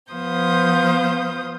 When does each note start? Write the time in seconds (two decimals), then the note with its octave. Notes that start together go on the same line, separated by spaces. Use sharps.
0.11 F3 B3 C5 F5 D#6 G6